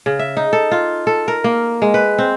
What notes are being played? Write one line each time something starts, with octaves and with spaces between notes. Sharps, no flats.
C#3
E5
D#4
A4
F4
A4
A#4
A#3
G#3
B4
C4